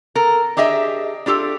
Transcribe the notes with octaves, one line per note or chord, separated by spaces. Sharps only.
A4 A#4
D4 G4 G#4 D#5 E5
D4 F4 G4 A4